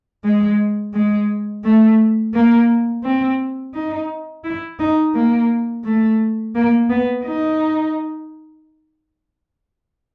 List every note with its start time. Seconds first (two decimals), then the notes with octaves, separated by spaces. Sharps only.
0.25 G#3
0.94 G#3
1.64 A3
2.34 A#3
3.04 C4
3.74 D#4
4.44 E4
4.79 D#4
5.15 A#3
5.84 A3
6.55 A#3
6.89 B3
7.24 D#4